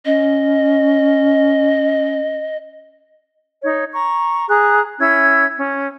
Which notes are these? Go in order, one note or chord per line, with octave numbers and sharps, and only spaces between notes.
C#4 D#5
D#4 C#5
A#5 C#6
G#4 A#5 F#6
C#4 E4 E6 G#6
C#4